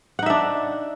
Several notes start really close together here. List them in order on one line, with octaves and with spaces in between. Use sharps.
F#5 D#4 E5 D4